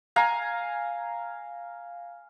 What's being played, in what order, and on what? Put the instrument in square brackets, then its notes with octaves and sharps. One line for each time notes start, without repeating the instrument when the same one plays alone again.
[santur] F5 G#5 A#5